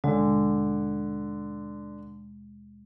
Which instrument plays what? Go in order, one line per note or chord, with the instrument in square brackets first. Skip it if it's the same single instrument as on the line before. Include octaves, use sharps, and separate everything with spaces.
[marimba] D#2 B2 G#3 [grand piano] D3